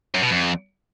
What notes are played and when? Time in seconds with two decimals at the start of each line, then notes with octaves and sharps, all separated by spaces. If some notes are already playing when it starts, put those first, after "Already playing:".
0.15 F#2
0.23 B2
0.31 F2